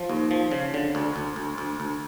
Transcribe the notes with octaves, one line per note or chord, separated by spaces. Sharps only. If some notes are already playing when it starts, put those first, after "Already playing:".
Already playing: F3
D#2
F3
C#3
D3
D2
D2
D2
D2
D2